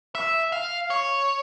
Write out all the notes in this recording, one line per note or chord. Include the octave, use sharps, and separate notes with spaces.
E5
F5
C#5